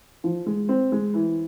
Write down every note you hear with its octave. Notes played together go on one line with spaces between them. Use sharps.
F3
G#3
C4
G#3
E3